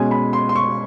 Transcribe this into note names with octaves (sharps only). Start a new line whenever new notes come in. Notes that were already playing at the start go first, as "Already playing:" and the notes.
Already playing: B2 G#3 C#4 G#5
B5
C6
C6
C#6